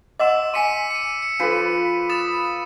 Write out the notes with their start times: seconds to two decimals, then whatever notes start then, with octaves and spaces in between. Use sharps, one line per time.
0.19 D#5 F#5 C6 D6 E6 E7
0.54 G#5 C6 B6 C#7 D#7
0.91 C#7 D#7
1.22 C#7
1.40 F3 D4 A4 B4
2.09 D#6 A6 E7